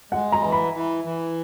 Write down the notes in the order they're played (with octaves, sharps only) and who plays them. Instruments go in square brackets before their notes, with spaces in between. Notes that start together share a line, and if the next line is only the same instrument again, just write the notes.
[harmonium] G#3 [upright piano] F#5
[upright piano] A#5
[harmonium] E3 [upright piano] A#5
[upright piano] B5
[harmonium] E3
E3